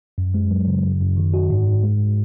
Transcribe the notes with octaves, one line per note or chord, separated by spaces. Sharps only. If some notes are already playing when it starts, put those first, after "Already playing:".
F#2
G#3
F#3
C#3
F#2
F#2
D#3
F#4
G#2
G#2
G#3